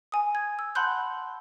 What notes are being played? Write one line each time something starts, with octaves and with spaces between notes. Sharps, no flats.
G#5 D#6
G#6
E6
F#5 A5 B5 C6 F#6 G6